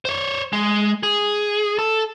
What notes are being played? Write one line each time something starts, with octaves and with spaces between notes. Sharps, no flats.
C5 C#5
G#3
G#4
A4